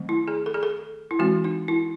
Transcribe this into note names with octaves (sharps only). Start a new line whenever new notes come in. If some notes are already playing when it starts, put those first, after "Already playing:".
Already playing: D#3 F#3 A3 C4
E4
G#4
A4
G#4
A4
E4
E3 G#3 C4 F#4
D#4
E4